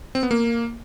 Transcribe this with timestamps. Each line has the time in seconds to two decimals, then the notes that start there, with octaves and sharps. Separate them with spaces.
0.15 C4
0.23 B3
0.31 A#3